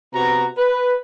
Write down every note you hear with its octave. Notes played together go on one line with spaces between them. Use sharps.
C3 B3 F#4 A#5
B4